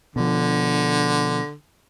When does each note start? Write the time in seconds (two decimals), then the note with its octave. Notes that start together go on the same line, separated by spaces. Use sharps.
0.16 B2 D3 F3